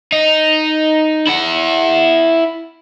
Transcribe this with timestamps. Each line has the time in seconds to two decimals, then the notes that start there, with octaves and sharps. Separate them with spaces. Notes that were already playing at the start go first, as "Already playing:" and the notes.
0.12 D#4
1.27 E4 F#5